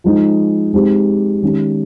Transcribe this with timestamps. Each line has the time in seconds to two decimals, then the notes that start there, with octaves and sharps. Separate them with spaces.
0.04 F3 G#3 D#4
0.73 G#3 C4 D#4 G4
1.42 D#3 G#3 C#4 G4